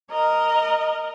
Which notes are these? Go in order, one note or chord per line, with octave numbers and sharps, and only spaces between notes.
A#4 D#5